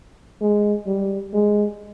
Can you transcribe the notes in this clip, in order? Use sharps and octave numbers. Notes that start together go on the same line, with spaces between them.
G#3
G3
G#3